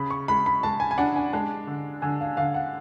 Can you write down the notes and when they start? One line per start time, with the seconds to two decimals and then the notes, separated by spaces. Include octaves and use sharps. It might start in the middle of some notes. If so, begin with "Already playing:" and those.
Already playing: C#3 B5
0.10 C#6
0.28 G#3 B5
0.46 B5
0.63 G#3 A5
0.80 G#5
0.91 G#5
0.98 D4 F#5
1.16 G#5
1.33 G#3 A5
1.67 D3
2.02 D3 G#5
2.20 F5
2.37 D3 F5
2.54 F#5